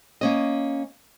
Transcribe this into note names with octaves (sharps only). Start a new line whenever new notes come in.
A#3 C#4 D#5